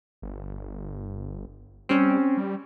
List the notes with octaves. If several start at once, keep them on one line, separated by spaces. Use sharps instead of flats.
G1
G3 C4 C#4
G3